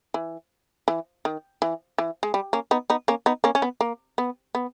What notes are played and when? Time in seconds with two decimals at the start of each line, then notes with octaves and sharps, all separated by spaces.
0.14 E3
0.88 E3
1.25 D#3
1.62 E3
1.98 E3
2.23 G#3
2.34 G3
2.53 A#3 C#4
2.71 B3 D#4
2.90 B3 D#4
3.08 A#3 C#4
3.26 B3 D#4
3.44 A#3 C#4
3.55 C#4
3.62 B3
3.81 A#3
4.18 B3
4.55 B3